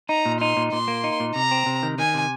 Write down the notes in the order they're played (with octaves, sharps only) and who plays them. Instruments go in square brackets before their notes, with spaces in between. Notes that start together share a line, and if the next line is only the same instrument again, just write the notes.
[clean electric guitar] D#4 [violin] A#5
[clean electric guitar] A#2
[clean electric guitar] D#4 [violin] C6
[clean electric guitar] A#2
[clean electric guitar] A#2 [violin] C6
[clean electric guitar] A#3
D#4
A#2
[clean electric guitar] C3 [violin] A#5
[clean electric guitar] C4
C3
D#3
[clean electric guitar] D#3 [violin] G#5
[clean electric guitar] C3